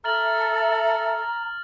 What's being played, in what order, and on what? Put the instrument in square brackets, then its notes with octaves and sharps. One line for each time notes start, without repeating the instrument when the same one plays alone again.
[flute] A4 [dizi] E5 [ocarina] A#5 [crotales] F6 A6 F#7